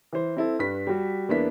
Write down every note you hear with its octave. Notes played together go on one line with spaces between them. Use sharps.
E3 C5
C4 E4 A4
G2 B4 B6
G3 F#4
E2 A#3 B3 D4 E4 B6